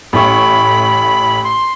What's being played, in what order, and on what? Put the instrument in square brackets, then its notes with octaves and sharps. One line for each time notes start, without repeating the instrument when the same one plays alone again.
[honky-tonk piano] A1 A3 C#6 [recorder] B5
[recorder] C6